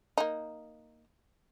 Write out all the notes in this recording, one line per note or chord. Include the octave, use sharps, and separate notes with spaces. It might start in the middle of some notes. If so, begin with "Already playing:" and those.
A#3 D#4